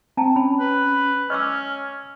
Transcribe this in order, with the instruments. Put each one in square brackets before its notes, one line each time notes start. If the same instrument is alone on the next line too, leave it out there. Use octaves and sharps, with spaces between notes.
[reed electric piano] C4 [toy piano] G5 A5 A#5
[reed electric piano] C#4 [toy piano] B5
[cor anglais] B4
[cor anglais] C#4 [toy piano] D#5 D6 E6 [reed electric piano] F6